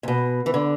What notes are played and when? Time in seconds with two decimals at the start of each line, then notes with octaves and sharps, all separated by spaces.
0.03 C3
0.08 B2
0.46 E3
0.54 D3